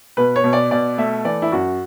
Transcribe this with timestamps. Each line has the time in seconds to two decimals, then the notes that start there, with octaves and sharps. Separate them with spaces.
0.17 B2 B4
0.36 C#5
0.44 B2
0.53 D5
0.71 B2 D5
0.98 A3 E5
1.25 E3 D5
1.42 E4
1.52 F#2 F#4